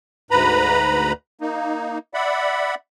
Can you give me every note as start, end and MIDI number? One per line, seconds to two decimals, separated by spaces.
0.31 1.13 38
0.31 1.13 44
0.31 1.13 71
0.31 1.13 82
0.31 1.13 83
1.41 1.98 58
1.41 1.98 63
2.14 2.75 74
2.14 2.75 76
2.14 2.75 78
2.14 2.75 83